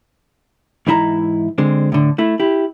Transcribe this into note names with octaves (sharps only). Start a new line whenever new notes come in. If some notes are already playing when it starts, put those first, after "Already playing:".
G#2 E3 D#4 E4 E5 A#5
D3 G#3 C4
A2 D3
A3 E4
E4 G4